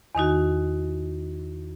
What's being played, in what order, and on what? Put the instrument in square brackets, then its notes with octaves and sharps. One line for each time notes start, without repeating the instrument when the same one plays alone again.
[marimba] E2 D#3 D#4 F#4